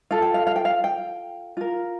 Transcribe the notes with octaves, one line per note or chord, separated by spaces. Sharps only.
F4 A4 F5
G5
F5
F5
G5
F5
G5
F4 A#4